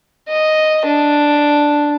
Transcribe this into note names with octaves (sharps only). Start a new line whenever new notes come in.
D#5
D4